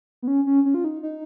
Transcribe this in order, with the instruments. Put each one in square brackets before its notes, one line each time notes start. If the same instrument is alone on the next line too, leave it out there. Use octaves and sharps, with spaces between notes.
[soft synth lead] B3
C#4
C#4
C#4
F4
D#4
D#4